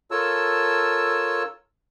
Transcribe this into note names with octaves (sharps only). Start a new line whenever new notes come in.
F4 A4 A#4 C#5 A5 E6